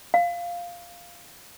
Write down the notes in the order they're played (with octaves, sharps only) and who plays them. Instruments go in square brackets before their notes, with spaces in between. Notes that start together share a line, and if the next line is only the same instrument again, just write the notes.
[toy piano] F5